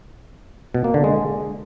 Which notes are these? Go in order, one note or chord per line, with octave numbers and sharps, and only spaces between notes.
B2
A#3
D3
G#3